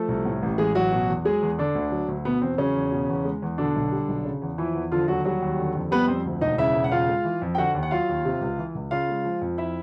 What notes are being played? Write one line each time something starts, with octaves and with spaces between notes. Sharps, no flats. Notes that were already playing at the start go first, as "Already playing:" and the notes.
Already playing: F3 A3 A4
C2
A2
A1
E3 G#3 G#4
A1 F#3 F#4
B2
E2
F#3 G#3 G#4
E2
D3 D4
D2
F#3
D2
B2 B3
E2 C4
C#3 F#3 C#4
E2
B2
E2
G#3
E2
B2 D3 D4
B1
G3
B1
C#3
E2
E3 F3 E4
E2
D3 F3 F4
D#2 F#3 F#4
F#3 G3 F#4
D#2
D3
F2
G3 B3 B4
F2 C4 C5
D2
E1 D#4 D#5
C#3 E4 E5
E1
F#5
C#3 F4 F5
G#3
E3
F2
G5
D3 F#4 F#5
D#2
F#5
F#3 F4 F5
D#2
C3
C#2
E3
C#2
C#3 F4 F5
G#3
F3
F2
E4 E5